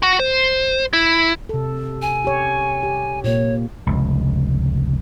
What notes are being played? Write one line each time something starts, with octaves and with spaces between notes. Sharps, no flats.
F#4 F#5
C5
E4
C3 A4
G#5
G4 C#5
G4
A#2 A#3 C#5
F1 C#2